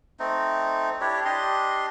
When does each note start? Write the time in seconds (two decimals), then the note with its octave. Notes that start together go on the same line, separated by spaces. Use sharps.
0.20 A3 C4 D#4
1.01 D4 E4 G4 C#5
1.25 D4 G4 D#5 C6